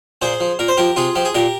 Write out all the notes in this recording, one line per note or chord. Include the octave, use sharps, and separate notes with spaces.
A#2 G#4 C5
F3
A#2 A#4
C5
F3 G4 A#4
C3 F4 G#4
F3 G4
G#4
A#2 G4 A#4